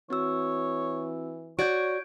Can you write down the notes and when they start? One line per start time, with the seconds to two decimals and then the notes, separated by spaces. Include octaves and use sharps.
0.10 E3 C4 F#4 C#5 E6
1.59 F#4 C#5 D5 G6 G#6 D7